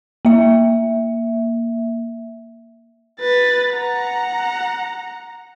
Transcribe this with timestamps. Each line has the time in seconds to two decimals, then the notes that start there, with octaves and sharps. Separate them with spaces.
0.25 A#3 E5
3.21 B4 A6
3.74 F#5 A#5